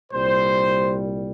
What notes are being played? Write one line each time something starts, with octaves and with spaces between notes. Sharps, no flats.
C2 A#2 G3 C5